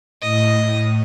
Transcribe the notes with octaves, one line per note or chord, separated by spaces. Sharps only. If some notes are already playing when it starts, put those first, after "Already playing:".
A2 D#5